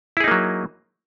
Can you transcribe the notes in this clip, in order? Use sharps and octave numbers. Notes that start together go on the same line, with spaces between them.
F#3 A#3 D#4 E4 G#4